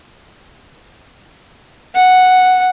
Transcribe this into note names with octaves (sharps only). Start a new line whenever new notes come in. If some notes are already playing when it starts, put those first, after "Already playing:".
F#5